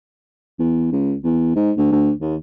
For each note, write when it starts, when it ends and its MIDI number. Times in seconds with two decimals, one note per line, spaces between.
0.59 0.90 40
0.92 1.15 37
1.23 1.55 40
1.56 1.71 44
1.77 1.92 38
1.92 2.11 38
2.21 2.35 39